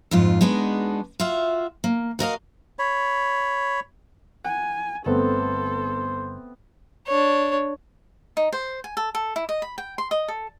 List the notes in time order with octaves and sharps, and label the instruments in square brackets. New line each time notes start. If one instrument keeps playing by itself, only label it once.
[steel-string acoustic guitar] F2 G#2 F4
G#3 B3 D4 D#4 F#4
F4 F#4 E5 F5
A#3
F#4 A#4 D#5 F5
[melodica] C#5 B5
[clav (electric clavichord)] F#5 [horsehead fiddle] G#5
[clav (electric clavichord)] G1 [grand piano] A3 B3 C4 [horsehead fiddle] A4 [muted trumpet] C5
[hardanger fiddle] D4 C#5
[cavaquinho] D#4
C5
G#5
A4
A4
E4
D#5
B5
G5
C6
D#5
A4